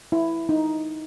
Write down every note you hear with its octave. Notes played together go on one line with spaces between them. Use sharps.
E4
D#4